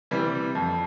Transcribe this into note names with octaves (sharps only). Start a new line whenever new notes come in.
C3 E3 G3
F2